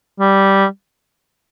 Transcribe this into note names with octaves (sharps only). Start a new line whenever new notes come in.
G3